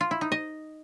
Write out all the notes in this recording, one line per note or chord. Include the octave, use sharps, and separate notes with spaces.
F4
E4
D#4
D#5